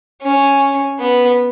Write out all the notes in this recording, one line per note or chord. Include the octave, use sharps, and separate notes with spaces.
C#4
B3